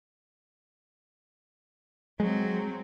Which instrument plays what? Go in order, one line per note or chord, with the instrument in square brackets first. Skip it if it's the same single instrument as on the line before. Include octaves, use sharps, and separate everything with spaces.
[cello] F#3 C4 [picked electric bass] G#3